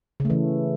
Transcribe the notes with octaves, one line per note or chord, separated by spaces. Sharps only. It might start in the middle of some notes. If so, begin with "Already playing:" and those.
C#3
A3
E3